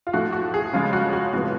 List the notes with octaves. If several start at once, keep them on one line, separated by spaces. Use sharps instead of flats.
F4
A2 F3 A3 F#4
F#4
G#4
C#3 F3 G#3 F4
F#4
F#4
A2 F3 G#3 B3 F#4